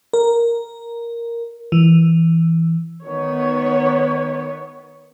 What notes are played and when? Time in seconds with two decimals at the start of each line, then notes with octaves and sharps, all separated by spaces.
0.13 A#4
1.72 E3
3.05 D#3 B3 C#5